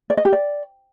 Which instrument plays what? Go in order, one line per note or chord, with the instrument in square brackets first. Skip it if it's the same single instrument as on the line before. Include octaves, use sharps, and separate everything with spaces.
[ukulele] D5
D#5
G4
D5